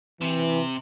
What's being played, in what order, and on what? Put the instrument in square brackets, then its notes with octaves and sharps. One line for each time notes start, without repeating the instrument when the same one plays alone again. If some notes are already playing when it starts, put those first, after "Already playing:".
[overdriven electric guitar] C3 [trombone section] E3